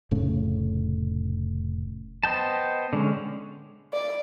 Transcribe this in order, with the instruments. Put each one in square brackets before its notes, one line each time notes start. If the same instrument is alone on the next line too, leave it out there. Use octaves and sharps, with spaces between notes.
[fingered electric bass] F1 A2 C#3
[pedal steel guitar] B3 C5 D#5 G5 A5
D3 G#3 C#4
[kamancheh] D5